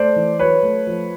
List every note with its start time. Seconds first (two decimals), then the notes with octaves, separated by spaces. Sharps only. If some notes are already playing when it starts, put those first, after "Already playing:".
Already playing: A3 C5 D5
0.16 E3
0.39 F#3 B4 C#5
0.63 A3
0.87 F3